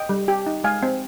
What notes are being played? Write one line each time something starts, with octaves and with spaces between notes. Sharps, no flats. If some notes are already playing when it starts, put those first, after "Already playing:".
Already playing: D#5 G5
G3
G4
D#4
G#3 F5 G#5
C4